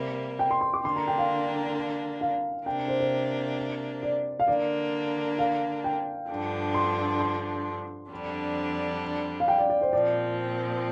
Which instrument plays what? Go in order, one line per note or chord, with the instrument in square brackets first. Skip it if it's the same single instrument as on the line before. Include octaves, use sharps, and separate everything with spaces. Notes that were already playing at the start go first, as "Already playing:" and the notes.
Already playing: [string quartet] C3 G3 A#3
[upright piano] G5
C6
C6
D6
[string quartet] D3 A#3 D4 [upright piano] C6
[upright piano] A#5
G5
F5
F5
[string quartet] C3 A#3 D4 [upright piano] G5
[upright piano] C5
C5
D5
F5
[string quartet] D3 A#3 D4 [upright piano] D5
[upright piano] F5
G5
[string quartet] G2 D3 F3 D4
[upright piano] C6
C6
[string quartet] F2 D3 G3 D4
[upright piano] F5
G5
D5
D5
C5
[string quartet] A#2 F3 C4 [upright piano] D5